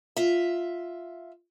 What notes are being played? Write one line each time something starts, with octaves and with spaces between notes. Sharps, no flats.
F4 E5